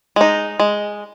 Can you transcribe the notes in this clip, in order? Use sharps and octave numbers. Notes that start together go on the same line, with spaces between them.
G#3 D#4
G#3